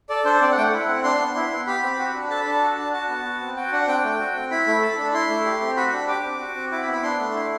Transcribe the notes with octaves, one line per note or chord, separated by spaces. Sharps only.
A4 D5
D4 C5
C4 D5
F#5
A3 F#5 G5
E4
C4
D4 C6
B3
E4
B3
G4 B5
C4
F#4
D4
A4 A5
B5
D4 A5
F#4
D4
F#4 A5
B3
F#4
C4
F#4 G5
D4 F#5
C4 G5
A3
F#4
C4
E4 B5
A3
A4
D4
E4 C6
A3
G4
C4
F#4 B5
D4
G4 D6
C4
F#4
C4
E4 D6
B5
B3
B5
D4 C6
A3
E4